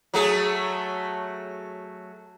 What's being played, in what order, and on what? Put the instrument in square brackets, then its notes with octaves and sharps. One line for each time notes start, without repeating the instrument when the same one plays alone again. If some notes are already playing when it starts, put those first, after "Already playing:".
[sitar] F#3 A3 G#4